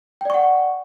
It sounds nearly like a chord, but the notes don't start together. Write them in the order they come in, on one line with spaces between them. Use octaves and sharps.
G5 D5 C#6 F#5